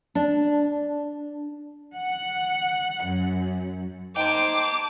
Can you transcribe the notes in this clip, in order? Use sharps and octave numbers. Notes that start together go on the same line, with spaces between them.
D4
F#5
F#2
D#4 C5 G5 A5 D6